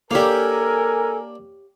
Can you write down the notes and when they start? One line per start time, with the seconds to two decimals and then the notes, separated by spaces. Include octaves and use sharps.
0.11 A#3 D4 G4 A4 A#4 C#5 F5 G#5